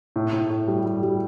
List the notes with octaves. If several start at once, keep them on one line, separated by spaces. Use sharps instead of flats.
A2
A2
A2
G3
G3
G3